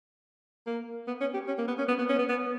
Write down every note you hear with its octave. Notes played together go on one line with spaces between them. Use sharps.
A#3
B3
C#4
G4
C#4
A#3
B3
C#4
B3
B3
C#4
B3
B3